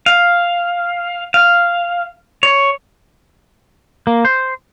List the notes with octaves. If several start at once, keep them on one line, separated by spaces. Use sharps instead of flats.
F5
F5
C#5
A#3
C5